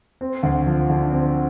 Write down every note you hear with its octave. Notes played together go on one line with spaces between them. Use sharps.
C4
D2
F3
D3
C4